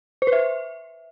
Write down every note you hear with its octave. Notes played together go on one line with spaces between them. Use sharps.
C5
B4
E5